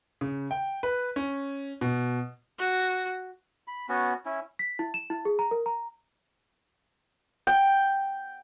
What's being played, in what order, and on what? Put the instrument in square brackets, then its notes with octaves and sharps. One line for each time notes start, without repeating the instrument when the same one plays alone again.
[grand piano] C#3
G5
B4
C#4
B2
[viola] F#4
[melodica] B5
B3 C#4 F#4
C#4 E4
[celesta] B6
E4
E7
E4
G#4
A#5
A#4
A#5
[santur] G5